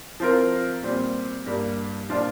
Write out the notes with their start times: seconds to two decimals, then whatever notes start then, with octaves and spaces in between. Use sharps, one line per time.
0.20 F3 C4 F4 A#4
0.83 A#2 G3 C4
1.46 G2 G3 A#3
2.09 A#2 F3 D4 F4